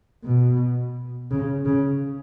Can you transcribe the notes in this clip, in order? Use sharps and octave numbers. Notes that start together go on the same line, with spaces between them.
B2
C#3
C#3